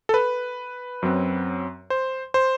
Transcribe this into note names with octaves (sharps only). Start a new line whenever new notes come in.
A4
B4
F#2 F#3 C4
C5
C5